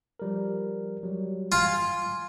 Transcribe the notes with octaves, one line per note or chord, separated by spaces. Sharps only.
F3 G3 A#4
F#3 G3
F4 G#5 C6 G#6